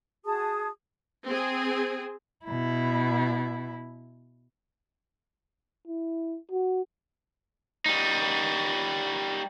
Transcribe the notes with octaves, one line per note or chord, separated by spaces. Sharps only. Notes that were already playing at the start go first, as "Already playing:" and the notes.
F#4 G#4 A5 D#6
C4 G#4
B2 E4
E4
F#4
G3 D#4